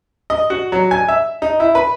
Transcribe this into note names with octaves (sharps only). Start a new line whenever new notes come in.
D#5
F#4
F#3
G#5
E5
D#4
E4
B4